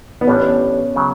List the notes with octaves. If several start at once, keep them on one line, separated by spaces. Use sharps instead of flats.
B3
A1 A2 G3 C#4 D4
C#3 F#3